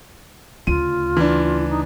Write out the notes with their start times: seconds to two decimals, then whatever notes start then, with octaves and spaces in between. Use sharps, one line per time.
0.67 D2 C#3 F4 D#7
1.17 E3 D4
1.70 D#4